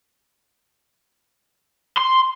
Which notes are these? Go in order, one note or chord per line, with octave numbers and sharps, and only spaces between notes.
C6